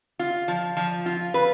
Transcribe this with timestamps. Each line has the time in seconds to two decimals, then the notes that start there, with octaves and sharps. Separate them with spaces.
0.19 F4
0.48 F3
0.77 F3
1.06 F4
1.34 B4